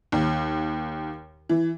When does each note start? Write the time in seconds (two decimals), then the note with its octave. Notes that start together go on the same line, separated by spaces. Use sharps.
0.12 D#2
1.49 E3